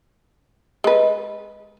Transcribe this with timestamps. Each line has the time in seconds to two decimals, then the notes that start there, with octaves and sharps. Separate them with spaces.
0.84 G#3 B4